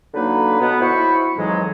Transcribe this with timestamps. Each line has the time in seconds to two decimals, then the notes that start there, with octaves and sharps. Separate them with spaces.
0.14 D3 F#3 A#3 D#4 B4
0.60 B2 B3
0.81 E4 F#4 C5 B5 C#6
1.37 F2 G#2 E3 F#3 G#3